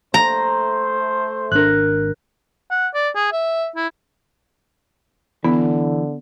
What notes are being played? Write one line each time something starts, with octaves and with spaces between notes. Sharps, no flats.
A3 C5 A#5
G#1 D4 A#4 F#6
F#5
D5
G#4
E5
E4
D3 E3 B3